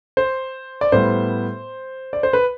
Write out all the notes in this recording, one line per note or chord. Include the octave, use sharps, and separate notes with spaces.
C5
D5
A2 G3 B3 C5
D5
C5
B4